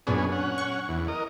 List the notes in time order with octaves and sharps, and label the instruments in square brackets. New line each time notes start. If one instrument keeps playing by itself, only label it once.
[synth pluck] F#2 A#2 D4 [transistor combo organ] B3 C#4 G#4
[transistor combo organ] C#4 F#5
[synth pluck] C#6
[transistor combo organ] E2
A#4 D#5